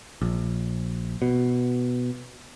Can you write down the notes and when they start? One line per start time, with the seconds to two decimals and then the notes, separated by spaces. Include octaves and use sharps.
0.22 A#1
1.22 B2